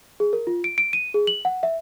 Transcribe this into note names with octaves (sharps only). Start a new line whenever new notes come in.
G#4
A#4
F4
D7
D7
D#7
G#4
F#7
F#5
E5